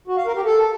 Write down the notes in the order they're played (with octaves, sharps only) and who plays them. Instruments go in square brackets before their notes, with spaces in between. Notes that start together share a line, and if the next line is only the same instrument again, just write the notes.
[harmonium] F#4
F5
A#4
G4
A4